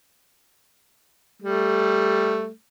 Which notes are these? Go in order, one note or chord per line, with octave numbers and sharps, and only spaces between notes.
G3 A3